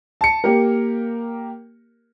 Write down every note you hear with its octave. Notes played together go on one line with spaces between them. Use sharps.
A5 C#7
A#3 G4 A#4